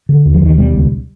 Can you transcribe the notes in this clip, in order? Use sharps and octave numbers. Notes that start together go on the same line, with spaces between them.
D3
D#2
F3
D#2 D#3
B2 G3
C#2